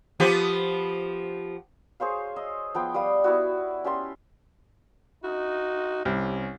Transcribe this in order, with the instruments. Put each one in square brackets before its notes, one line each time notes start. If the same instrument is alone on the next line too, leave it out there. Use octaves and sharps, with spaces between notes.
[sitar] F3 B3 G4
[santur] G#4 C5 C#5 F5
D#5 E6
F3 B3 G5
G3 D5 F5 D#6
B3 E4 F#4
C#4 G4 A5 C6
[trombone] D#4 [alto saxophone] F#4
[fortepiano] C2 [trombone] C#4 [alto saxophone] G4